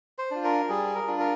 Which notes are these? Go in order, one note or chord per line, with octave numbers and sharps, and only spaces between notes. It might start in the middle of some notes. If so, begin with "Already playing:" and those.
C5
D4 F4
A#4
G3 G#4
A#4
D4 F4
A#4